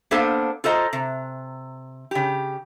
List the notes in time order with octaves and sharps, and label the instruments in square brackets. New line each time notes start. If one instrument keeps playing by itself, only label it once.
[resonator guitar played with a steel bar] A#3 B3 D4 A4 C5 F5
F4 A4 C5 D#5 A#5
C3
C#3 G4